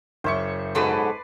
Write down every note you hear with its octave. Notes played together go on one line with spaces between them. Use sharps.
F#1 C5 C#5 E5 C#6
G#2 B2 F#3 A4 B4 D5 C6